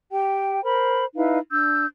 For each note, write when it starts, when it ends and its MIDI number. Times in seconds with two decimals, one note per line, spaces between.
0.11 0.62 67
0.11 0.62 79
0.63 1.04 70
0.63 1.04 72
0.63 1.04 83
1.15 1.39 63
1.15 1.39 64
1.15 1.39 71
1.15 1.39 77
1.50 1.85 62
1.50 1.85 88
1.50 1.85 91